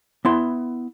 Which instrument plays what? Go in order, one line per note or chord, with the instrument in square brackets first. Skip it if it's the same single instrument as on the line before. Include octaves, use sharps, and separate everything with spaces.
[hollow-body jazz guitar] B3 E4 C6